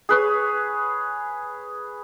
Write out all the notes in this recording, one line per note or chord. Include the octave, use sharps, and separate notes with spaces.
G#4 B4 C#5